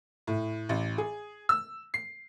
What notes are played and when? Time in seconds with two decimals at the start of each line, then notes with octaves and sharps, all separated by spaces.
0.27 A2
0.69 A1
0.98 G#4
1.49 E6
1.94 C7